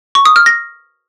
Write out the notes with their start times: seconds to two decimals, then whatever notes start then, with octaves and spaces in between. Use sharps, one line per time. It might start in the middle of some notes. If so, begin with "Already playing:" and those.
0.15 C#6
0.25 D#6
0.36 F6
0.46 A#6